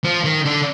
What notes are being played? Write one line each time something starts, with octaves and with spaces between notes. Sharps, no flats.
F3
D#3
D3